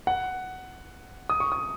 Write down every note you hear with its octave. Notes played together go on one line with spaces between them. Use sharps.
F#5
D#6
C#6
D#6